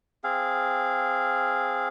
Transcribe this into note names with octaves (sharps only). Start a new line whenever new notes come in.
C4 G#4 F5